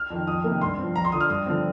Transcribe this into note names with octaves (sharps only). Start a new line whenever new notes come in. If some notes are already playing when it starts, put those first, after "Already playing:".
Already playing: F6
F2 D#3
F2 D#6
C3 D#3 A#3
G2 C6
F3 C4
F2 A#5
C6
D3 F3 D#6
F6
G2 D#6
D3 F3 C4